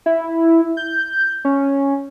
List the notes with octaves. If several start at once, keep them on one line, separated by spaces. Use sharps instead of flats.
E4
G6
C#4